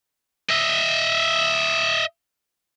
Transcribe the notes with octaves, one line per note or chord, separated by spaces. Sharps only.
D#5 E5